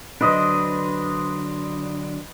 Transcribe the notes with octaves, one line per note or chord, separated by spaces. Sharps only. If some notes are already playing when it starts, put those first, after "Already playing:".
D3 F#3 D4 B4 C5 D#5